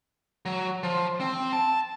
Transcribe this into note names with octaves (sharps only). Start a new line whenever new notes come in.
F#3
F3
C4
A5